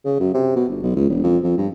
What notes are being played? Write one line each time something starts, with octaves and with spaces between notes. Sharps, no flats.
C#3
F#2
C3
B2
G1
B1
C#2
E1
F2
F2
G2